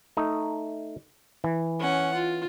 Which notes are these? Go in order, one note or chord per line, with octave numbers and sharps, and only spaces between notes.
A3 D#4
E3
C#4 F#5
F4